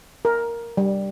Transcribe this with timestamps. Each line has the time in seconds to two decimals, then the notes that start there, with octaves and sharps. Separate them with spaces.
0.25 A#4
0.77 G3